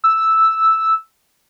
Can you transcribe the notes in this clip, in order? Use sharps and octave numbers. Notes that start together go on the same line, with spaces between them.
E6